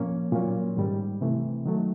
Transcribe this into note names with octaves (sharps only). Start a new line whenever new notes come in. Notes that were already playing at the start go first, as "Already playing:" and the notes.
Already playing: A#2 F3 A#3 C#4
A#2 F#3 A#3 C#4
G#2 D#3 G3
C3 E3 A3
D#3 F#3 A3